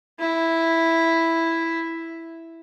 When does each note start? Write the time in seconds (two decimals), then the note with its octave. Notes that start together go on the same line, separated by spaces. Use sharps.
0.20 E4